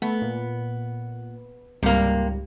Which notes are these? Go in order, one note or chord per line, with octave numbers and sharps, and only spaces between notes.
A3 B3
A#2
C#2 G#2 C3 G3 A#3